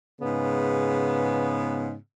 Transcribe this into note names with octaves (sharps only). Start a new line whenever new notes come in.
G#2 C#3 B3